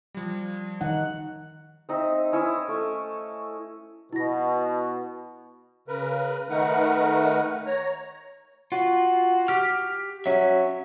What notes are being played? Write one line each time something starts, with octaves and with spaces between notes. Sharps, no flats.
F3 G3
D#3 D#4 F#5
C4 D#4 D#5 E5
C#4 E4 C#5 D#5
A3
B2 E4 A#6
C#3 A#4 B4
D#3 A3 D#4 A#4 B4 F#5
C#5 A#5
F4 F#4
G4 F6
F#3 C#4 E5